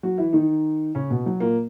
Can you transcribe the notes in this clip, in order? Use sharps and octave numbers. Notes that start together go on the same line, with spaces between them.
F#3 F#4
E3 E4
D#3 D#4
C#3 C#4
B2 B3
F#3
A#2 A#3